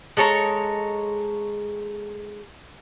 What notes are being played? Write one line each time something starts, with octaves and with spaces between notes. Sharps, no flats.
G#3 A4 C#5 A#5